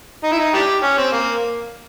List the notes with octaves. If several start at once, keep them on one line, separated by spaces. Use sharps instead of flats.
D#4
E4
D#4
D4 E4 G4
C#4
C4
A#3